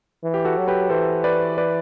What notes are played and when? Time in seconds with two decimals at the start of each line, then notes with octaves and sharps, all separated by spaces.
0.23 E3
0.34 G4
0.45 F#4 A4
0.57 F#3
0.68 G4 B4
0.90 E3 A4 C5
1.24 B4 D5
1.58 B4 D5